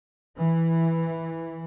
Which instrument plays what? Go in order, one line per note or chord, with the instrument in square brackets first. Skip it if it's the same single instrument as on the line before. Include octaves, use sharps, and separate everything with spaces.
[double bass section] E3